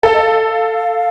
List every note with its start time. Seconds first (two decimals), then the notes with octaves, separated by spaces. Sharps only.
0.03 A4 F5
0.13 D#5
0.24 F5